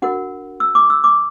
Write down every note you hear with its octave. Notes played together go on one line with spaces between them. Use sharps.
D4 F#4 A#4 F#5
E6
D6
E6
D6